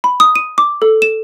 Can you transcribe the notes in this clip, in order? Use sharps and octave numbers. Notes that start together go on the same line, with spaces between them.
B5
D#6
D#7
D6
A4
E7